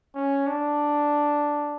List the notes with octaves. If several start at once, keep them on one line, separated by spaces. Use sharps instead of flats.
C#4
D4